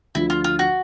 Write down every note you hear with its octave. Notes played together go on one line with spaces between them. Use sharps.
D2 D3 F3 E4
F4
F4
F#4